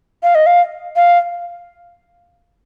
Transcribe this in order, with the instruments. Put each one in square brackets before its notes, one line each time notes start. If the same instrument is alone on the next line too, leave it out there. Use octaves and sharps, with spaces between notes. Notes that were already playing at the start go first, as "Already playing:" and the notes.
[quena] F5
D#5
F5
F5